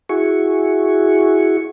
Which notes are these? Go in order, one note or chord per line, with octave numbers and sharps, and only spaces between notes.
E4 F#4 G#4 C#6